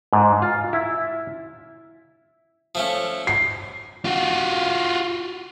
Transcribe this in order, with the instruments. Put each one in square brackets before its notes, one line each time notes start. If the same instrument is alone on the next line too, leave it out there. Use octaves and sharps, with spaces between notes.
[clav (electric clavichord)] G#2
F4
E4
[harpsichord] F3 A3 C#4
[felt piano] C7
[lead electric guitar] F4 F#4